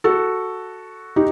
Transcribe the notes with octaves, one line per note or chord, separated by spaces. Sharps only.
F#4 A4
D#4 G4